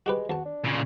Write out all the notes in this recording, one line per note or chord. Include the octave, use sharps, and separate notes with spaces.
G#3 F#4 G4 B4
E2 F#4 A5
D4
A#2 C#3